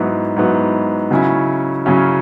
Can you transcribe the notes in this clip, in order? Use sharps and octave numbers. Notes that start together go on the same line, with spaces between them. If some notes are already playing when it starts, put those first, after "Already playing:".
Already playing: G#2 F#3 B3 E4
G#2 F#3 B3 E4
C#3 F#3 C#4 E4
C#3 F#3 C#4 E4